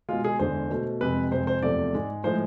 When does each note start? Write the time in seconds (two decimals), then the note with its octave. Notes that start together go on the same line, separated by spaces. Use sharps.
0.09 B2 G#3 F4
0.24 G#4
0.39 E2 D3 G#3 C5
0.70 B2 A3
1.01 F2 C3 G#3 B4
1.32 F2 C3 G#3 C5
1.47 C5
1.62 E2 C3 F3 A3 D5
1.94 G#2 G#3
2.24 A2 F3 G#3 C5